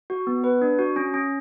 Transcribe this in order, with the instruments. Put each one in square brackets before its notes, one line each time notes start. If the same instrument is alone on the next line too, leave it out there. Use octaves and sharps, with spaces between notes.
[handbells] F#4
B3
B4
D4
F#4
C#4
C#4